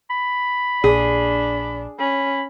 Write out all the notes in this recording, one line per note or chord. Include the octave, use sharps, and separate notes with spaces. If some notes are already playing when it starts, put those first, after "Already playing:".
B5
A#1 D4 G#4
C#4 B5